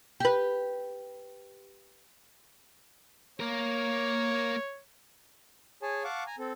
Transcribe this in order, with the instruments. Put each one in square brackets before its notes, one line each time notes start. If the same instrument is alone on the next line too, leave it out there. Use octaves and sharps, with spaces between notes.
[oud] G4 B4
[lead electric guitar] A#3 A#4 [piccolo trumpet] C#5
[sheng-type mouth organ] G#4 C#5 G#5 A5
F5 F#5 A5 C#6 D6
G#5 A#5
C4 A4